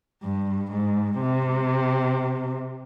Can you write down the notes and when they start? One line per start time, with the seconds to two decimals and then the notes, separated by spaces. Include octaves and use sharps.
0.23 G2
0.72 G#2
1.21 C3